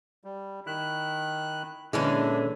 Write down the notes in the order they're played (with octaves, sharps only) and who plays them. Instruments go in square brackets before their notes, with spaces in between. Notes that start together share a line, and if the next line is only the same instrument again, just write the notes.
[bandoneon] G3
[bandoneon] D#3 F#6 [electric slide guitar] E4
[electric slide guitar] A#2 C#4 [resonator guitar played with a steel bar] D3 E3 G#3 [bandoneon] D4